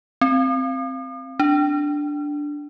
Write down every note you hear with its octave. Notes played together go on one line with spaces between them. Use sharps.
C4
D4